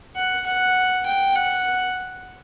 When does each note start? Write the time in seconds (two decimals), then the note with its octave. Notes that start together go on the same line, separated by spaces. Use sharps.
0.16 F#5
0.46 F#5
1.06 G5
1.36 F#5